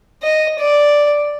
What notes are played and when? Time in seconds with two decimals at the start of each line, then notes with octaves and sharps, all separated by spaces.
0.23 D#5
0.59 D5